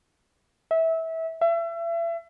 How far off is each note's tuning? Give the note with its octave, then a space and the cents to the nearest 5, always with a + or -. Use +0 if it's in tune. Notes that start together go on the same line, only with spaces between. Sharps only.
E5 -20
E5 +35